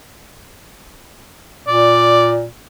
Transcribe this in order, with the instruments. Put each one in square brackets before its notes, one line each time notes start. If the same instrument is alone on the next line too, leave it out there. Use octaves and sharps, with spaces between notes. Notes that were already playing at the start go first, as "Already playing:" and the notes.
[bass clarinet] A#2 [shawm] D5